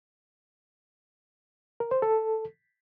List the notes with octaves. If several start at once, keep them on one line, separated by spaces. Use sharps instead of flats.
A#4
C5
A4